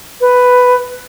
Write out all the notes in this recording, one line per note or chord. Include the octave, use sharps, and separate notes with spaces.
B4